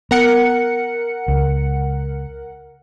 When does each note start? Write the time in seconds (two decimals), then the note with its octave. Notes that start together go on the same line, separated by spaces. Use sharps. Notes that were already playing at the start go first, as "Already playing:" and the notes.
0.11 B3 A#4 F#5 C#7
1.28 C#2